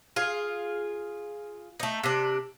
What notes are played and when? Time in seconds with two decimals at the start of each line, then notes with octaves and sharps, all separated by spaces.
0.16 F4 G#4
1.80 A3 D#4
2.03 C3 D4